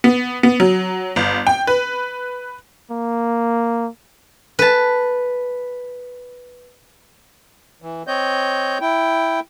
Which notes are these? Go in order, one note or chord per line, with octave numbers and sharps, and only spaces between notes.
B3
B3
F#3
G1
G5
B4
A#3
B4 A5
E3
C4 C#5 D#5 G6
E4 G5